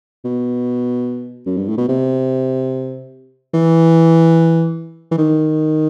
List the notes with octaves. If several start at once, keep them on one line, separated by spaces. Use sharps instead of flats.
B2
F#2
G2
A2
B2
C3
E3
E3
D#3